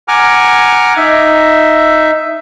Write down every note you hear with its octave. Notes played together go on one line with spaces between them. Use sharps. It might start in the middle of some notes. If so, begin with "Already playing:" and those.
F#5 G#5 A#5 D6 F6
D#4 E5